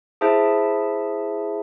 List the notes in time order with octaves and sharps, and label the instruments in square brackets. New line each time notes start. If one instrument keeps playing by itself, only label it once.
[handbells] E4 G#4 C5 E5 A5